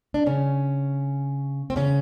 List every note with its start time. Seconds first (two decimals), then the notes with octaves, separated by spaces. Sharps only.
0.14 D4
0.26 C#3 C#4
1.70 C4
1.76 C#3 C#4